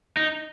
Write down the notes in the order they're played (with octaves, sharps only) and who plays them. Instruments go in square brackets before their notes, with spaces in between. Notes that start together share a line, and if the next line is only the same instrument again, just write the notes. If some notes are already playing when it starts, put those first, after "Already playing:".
[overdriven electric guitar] D#4